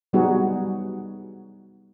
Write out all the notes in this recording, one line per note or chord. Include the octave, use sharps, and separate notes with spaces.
F#3 G3 B3 D#4 F#4 G#4